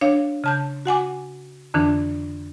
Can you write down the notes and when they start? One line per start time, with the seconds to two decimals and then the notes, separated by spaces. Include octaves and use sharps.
0.01 D4 C#5 F5
0.44 C#3 A5 G6
0.85 F#4 F#5 G#5 D6
1.74 F2 D3 E3 D4